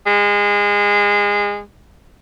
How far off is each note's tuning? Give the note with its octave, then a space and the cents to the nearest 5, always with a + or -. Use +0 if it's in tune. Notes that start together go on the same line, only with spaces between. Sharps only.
G#3 -25